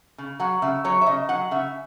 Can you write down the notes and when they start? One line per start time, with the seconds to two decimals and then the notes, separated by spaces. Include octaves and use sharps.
0.18 C#3
0.40 F#3 F#5
0.62 C#3 E5
0.84 F#3 C#5
1.01 E5
1.06 C#3 D#5
1.29 F#3 F#5
1.51 C#3 E5